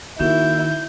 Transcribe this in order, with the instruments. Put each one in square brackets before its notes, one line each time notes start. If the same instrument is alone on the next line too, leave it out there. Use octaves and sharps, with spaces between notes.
[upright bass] D#3 [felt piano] A#3 F#4 E7 [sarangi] E4 [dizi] G6